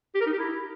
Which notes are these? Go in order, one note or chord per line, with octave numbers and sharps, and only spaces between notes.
G4
A#4
D#4
G4
E4